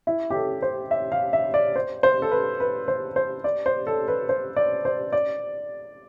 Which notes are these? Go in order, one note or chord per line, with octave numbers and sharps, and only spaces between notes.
E4
G4
A4
C5
E5
F5
E5
D5
C5
C5
A4
B4
B4
C5
C5
D5
C5
A4
B4
C5
D5
C5
D5